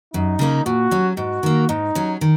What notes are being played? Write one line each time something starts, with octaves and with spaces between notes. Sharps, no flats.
F#2 D#4
C#3 A#3 C#4
A#2 F#4
F#3 C#4
G#2 F#4
D#3 A#3
G#2 D#4
F#3 C#4
D#3